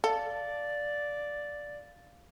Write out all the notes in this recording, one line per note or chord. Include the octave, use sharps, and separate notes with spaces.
A4 D5 F5